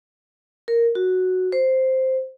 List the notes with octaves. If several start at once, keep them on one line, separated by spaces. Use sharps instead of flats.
A#4
F#4
C5